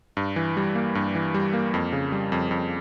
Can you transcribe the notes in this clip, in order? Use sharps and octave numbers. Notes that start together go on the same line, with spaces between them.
G2
E3
G3
A#3
G2
E3
G3
A#3
F2
C#3
G3
F2
F2